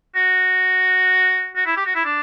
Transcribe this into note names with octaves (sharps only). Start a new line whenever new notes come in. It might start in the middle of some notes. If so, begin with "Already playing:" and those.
F#4
F#4
E4
G4
F#4
E4
D4